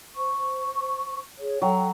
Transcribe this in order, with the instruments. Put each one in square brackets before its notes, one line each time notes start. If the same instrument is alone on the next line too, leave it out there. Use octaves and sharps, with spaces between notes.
[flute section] C5 C#6
G#4 C#5
[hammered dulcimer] F#3 [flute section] A4 G5